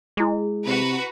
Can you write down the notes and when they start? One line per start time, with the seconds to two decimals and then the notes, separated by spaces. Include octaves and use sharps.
0.17 G#3 E4 G#4
0.66 C3 F#4 B4 A#5